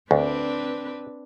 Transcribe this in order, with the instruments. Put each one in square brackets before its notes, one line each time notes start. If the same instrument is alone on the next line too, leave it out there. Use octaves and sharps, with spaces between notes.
[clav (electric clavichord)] D2 [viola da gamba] C4 D4 B4